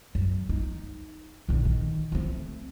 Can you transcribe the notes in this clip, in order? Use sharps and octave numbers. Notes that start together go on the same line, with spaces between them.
F#2
D#4
A#1 D3
D#3
A3 C4